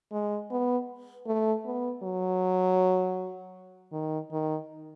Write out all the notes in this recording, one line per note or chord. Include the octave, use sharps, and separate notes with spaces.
G#3
B3
A3
B3
F#3
D#3
D#3